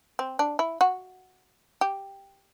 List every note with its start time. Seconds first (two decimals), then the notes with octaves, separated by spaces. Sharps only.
0.19 C4
0.39 D4
0.59 E4
0.81 F#4
1.81 G4